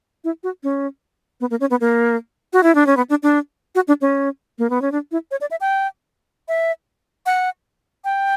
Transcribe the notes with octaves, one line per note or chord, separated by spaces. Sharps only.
E4
F#4
C#4
B3
A#3
C#4
B3
A#3
F#4
E4
D4
C#4
B3
D4
D4
F#4
D4
C#4
A#3
B3
C#4
D4
E4
C#5
D5
E5
G5
E5
F#5
G5